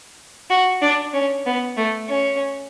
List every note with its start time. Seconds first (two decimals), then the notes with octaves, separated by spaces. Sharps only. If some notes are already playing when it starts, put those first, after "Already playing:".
0.50 F#4
0.82 D4
1.13 C#4
1.46 B3
1.77 A3
2.09 C#4